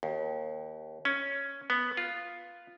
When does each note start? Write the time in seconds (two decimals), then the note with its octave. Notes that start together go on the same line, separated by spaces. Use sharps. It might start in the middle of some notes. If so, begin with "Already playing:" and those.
0.03 D#2
1.05 C#4
1.70 B3
1.97 F4